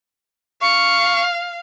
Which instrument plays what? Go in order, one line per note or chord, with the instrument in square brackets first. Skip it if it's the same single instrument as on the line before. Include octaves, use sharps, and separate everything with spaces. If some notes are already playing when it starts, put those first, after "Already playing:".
[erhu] F5 [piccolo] C#6